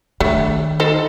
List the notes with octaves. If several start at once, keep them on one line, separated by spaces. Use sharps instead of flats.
D#3 A3 D4
D#4 A4 C5